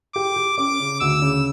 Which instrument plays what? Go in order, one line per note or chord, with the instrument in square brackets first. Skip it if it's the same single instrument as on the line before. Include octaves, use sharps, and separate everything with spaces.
[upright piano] G4 [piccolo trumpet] D6
[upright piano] G4
[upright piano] C#4 [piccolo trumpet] D6
[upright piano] C#3
[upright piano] D2 [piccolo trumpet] E6
[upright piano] C#3